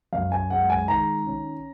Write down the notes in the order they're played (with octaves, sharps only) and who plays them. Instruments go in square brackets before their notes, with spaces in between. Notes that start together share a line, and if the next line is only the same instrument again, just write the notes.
[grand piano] F#2 F5
G#5
G#3 F#5
G#5
D#3 A#5
C#4